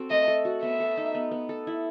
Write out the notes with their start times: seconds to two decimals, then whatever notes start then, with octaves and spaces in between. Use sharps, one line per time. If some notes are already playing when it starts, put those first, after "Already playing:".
Already playing: C4 F#4 A4
0.10 A3 D#5
0.28 A4
0.45 F#4
0.63 B3 E5
0.80 A4
0.97 D#4
1.15 B3
1.31 B3
1.49 A4
1.67 E4